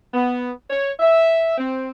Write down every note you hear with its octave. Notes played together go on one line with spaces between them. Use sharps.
B3
C#5
E5
C4